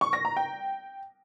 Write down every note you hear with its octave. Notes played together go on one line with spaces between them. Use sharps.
C#6
A#6
A#5
G5